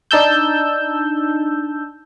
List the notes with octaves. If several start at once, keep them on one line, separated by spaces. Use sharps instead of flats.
D4 D#4 A5 E6 G6